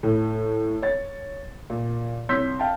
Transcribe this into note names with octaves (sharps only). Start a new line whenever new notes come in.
A2
C#5 A6
A#2
C2 C#5 C6 E6 G6 B6
F5 G5 A5